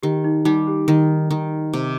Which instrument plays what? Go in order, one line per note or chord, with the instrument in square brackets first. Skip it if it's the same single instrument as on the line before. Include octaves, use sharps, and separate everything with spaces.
[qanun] D#3 [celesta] G4
[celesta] D#4
[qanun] G3 [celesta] D#4
[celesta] G4
[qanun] D#3
D#3
C3